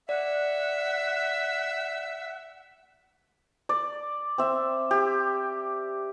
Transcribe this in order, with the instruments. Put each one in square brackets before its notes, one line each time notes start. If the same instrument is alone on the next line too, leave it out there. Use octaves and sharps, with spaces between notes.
[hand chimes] D5 [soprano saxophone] E5 [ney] F#5
[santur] D5
C4 E5
G4